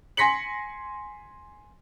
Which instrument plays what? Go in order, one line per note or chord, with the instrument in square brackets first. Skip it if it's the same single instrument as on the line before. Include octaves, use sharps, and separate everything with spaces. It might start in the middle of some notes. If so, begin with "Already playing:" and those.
[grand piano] G#5 C6 A#6 B6 C#7 F#7